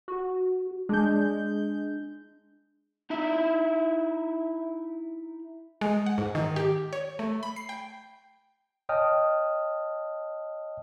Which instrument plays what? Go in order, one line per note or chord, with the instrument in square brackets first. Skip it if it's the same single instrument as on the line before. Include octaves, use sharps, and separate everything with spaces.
[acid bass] F#4
[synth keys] G#3 G6 [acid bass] D4
[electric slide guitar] D#4 E4 E5
[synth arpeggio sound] G#3
F#5
G#2
D#3
G4
C#5
A3
B5
C7
G5
[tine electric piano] C#5 D#5 G5 A5 D#6 F6